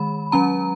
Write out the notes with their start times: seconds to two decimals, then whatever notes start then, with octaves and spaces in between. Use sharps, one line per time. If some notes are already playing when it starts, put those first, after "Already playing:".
Already playing: D#3 G#3 B5
0.32 F#3 C#4 A#5